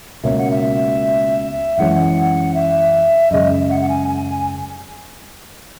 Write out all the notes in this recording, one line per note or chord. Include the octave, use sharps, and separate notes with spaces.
C#2 B2 A#3 C#4 E5
F#5
E5
F#2 E3 G#3 C#4 F#5
E5
F#2 C#3 G#3 D#5
E5
F#5
F#5
G#5
G#5